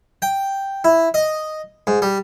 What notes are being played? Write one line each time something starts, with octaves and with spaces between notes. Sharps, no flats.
G5
E4
D#5
G#2
G3